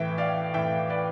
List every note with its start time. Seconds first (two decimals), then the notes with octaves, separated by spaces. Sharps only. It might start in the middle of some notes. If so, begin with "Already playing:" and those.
Already playing: A2 E3 E5 G5
0.18 D5 F5
0.54 A2 E3 E5 G5
0.90 B4 D5